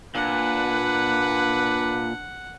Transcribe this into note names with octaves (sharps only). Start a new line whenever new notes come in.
A#2 D4 B4 F#5